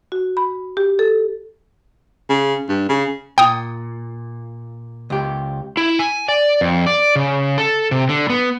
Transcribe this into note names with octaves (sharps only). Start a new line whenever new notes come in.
F#4
B5
G4
A4
C#3
G2
C#3
A#2 G5 D#6
C#2 G4
E4
G#5
D5
F2
D5
C#3
A4
C3
D3
B3